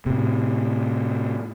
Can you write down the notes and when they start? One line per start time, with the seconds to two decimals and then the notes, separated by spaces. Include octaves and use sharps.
0.06 A2 C3